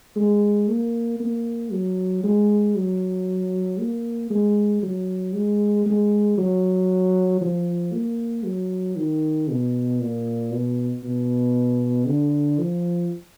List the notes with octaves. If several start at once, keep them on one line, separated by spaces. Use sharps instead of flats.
G#3
A#3
A#3
F#3
G#3
F#3
A#3
G#3
F#3
G#3
G#3
F#3
F3
A#3
F#3
D#3
B2
A#2
B2
B2
D3
F3